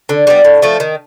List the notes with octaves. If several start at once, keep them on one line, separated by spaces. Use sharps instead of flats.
D3
G3 B3
A2
F3 A3
D#3